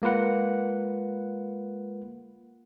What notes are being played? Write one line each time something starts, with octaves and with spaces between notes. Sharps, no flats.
G#3 A#3 F4 B4 F#5